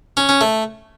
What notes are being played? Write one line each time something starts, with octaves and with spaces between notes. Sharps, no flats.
C#4
C#4
A3